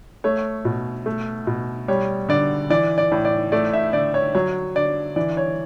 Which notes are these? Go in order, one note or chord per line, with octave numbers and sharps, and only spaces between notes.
A3 C#5
B2
A3
B2
G3 C#5
D3 D5
E3 D5
D5
A2
D5
A3 D5
E5
D3 D5
C#5
F#3 C#5
D3 D5
E3 D5
C#5